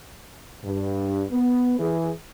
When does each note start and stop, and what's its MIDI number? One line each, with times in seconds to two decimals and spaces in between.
0.65 1.24 43
1.31 1.75 59
1.80 2.11 52
1.80 2.11 68